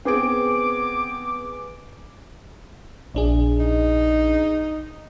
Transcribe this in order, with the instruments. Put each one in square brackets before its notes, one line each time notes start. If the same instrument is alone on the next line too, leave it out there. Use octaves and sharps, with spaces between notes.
[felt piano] B3 G#4 D7 [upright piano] C4 [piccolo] D6
[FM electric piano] A#1 D4 G#4
[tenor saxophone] D#4